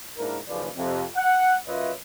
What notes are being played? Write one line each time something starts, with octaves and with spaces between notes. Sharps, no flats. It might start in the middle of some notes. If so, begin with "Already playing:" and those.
G#2 A#3 D4 E4 A#4
F#1 D#2 C#3 F3 B4 D5
F2 C3
F#5
F#2 F4 B4 C#5 D#5 E5